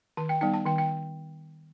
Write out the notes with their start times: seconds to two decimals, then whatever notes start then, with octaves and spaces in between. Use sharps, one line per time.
0.17 D#3 A5
0.29 G5
0.41 G3 B3 D#4 G5
0.54 A5
0.66 D#3 G5
0.78 G5